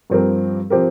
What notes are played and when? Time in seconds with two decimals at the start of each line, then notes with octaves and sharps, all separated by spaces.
0.10 G2 F3 C4 G4 A#4
0.70 F3 C4 G4 A#4